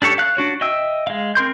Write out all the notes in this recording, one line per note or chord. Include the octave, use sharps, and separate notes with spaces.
D4 G4 A4 C#5
F5 F#6
D4 F#4 C#5
D#5 E5 G5 E6
G#3 F5
C4 A#4 C6 G6